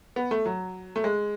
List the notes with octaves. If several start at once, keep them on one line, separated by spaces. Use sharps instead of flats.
B3
A3
F#3
A3
G#3